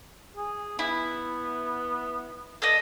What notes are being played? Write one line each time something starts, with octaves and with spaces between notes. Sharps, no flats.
G#4
B3 E4
A4 D5 D#5